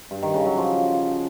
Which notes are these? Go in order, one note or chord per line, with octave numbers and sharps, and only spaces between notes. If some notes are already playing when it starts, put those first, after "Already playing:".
G2
D#3
C#3
F#3
F3